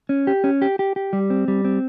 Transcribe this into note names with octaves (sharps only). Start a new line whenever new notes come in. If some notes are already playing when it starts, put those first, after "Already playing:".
C#4
G4
C#4
G4
G4
G4
G3
C4
G3
C4